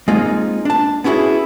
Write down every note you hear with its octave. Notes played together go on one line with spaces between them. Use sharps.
G#3 A#3 C4 D#4 F4
D4 A5
B3 C#4 E4 F#4 G#4